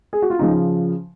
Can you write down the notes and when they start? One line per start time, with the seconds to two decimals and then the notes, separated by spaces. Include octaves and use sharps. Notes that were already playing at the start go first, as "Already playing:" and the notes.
0.13 G#4
0.22 F#4
0.30 F4
0.39 C#3 F3 D#4